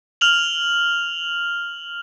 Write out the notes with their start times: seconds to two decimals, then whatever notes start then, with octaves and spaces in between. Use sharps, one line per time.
0.21 F6 F7 F#7